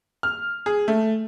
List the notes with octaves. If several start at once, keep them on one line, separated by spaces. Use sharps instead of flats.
F6
G#4
A3